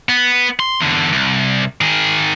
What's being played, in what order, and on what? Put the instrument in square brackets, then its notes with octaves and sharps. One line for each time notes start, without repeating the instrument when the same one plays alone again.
[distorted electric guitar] B3
C6
E2 D3
C2
D#3 G#4